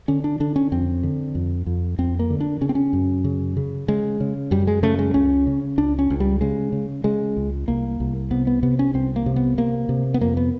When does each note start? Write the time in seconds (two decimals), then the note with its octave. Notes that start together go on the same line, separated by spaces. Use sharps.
0.08 D3 C#4
0.24 D4
0.40 D3 D4
0.56 C#4
0.72 F2 C4
1.03 D3
1.35 F2
1.66 F2
1.98 F2 C4
2.19 A#3
2.30 D3
2.40 D4
2.61 C#3 C#4
2.69 C4
2.75 C#4
2.93 F#2
3.24 C#3
3.57 C#3
3.88 C#3 G#3
4.20 C#3
4.51 F#2 G3
4.67 G#3
4.83 C#3 A3
4.99 G#3
5.14 C#2 C#4
5.47 C#3
5.78 C#2 D4
5.99 C#4
6.10 C#2
6.20 G3
6.41 C#3 G#3
6.72 C#3
7.04 C#3 G#3
7.37 C#2
7.68 C2 A#3
8.00 C2
8.31 C3 B3
8.47 B3
8.63 C3 B3
8.79 C#4
8.94 C2 C4
9.16 A#3
9.26 C3
9.36 B3
9.58 C3 A#3
9.89 C3
10.14 B3
10.21 F2 A#3
10.37 B3